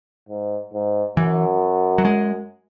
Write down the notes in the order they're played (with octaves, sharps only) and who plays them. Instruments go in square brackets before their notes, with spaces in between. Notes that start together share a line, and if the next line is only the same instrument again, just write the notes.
[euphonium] G#2
G#2
[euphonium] F#2 [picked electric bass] E3
[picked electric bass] F#3
G#3